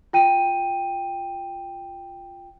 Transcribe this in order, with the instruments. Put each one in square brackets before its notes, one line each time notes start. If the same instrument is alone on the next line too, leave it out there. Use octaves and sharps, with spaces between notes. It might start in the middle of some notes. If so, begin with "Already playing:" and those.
[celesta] F4 G5 D#7